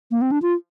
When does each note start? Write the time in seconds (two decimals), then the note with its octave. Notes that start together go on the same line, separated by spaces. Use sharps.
0.11 A#3
0.22 C4
0.31 D4
0.42 F4